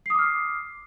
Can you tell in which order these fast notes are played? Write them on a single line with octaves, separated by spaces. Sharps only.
C7 D#6 D6 F6